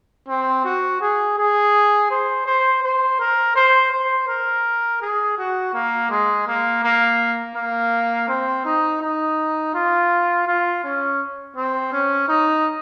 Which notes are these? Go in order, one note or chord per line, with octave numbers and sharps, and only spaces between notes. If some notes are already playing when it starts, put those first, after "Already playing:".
C4
F#4
G#4
G#4
C5
C5
C5
A#4
C5
C5
A#4
G#4
F#4
A#3
G#3
A#3
A#3
A#3
C4
D#4
D#4
F4
F4
C#4
C4
C#4
D#4